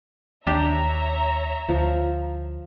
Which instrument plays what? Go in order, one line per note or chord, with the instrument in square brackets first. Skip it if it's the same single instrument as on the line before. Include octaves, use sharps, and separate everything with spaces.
[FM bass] D#2 [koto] D4 G4 [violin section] C#5 E5 A#5
[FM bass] D2 [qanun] F3